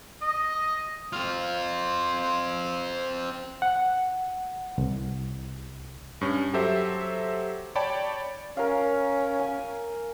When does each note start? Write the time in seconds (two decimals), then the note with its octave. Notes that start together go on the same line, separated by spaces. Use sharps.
0.22 D#5
1.13 C4 F4
3.62 F#5
4.78 C2
6.21 G2 C#4
6.53 F#3 G4 A4 C5 E5
7.75 C#5 D5 G5 A5 B5
8.57 C#4 A#4 F5
9.39 G#5